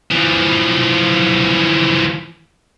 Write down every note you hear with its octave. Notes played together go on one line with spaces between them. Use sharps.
E3 F3